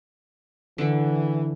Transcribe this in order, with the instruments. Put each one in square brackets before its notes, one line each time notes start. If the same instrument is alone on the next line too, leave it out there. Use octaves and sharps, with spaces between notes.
[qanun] D3 [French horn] E3